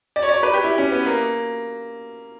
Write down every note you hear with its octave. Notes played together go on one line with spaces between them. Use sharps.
D5
C#5
D5
C#5
B4
G4
E4
C#4
B3
A#3